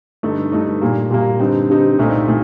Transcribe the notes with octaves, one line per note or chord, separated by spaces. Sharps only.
G2 D3 A3 D#4
G2 D3 A3 D#4
A#2 G3 A#3
A#2 G3 A#3
G2 D3 G3 C4 D#4
G2 D3 G3 C4 D#4
C2 A#2 A3 C4 D#4
A#2 A3